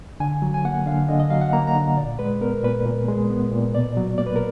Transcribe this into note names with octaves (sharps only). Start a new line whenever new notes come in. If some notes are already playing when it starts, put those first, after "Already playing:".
D3 G#5
F#3
G#5
A#3 F#5
D3 F5
D3 D#5
D#5
F#3 F5
F#5
A#3 A#5
A#5
D3
A#2 D5
G#3 B4
B3 A#4
A#2 B4
A#2
G#3
B3
A#2
B2 D5
F#3
A#3 D5
B4
A#4